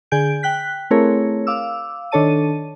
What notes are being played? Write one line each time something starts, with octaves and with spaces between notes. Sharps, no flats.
D3 G#4 G#5 G6 D7
G5 F#6 B6
A3 C4 E4 G#4 A#4 C#5
F5 D6 E6
D#3 D4 A4 C#5 A5 D#7